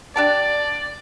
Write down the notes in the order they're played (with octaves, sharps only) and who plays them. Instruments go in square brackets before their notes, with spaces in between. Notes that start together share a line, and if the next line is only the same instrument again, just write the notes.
[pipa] D4 G4 A5 [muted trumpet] D5